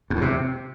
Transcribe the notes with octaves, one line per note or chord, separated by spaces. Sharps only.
F#2
E2
C3